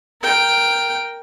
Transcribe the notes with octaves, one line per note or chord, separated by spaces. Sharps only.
A#4 G5